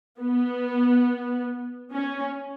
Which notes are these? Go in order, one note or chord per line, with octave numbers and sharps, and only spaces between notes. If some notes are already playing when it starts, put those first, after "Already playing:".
B3
C#4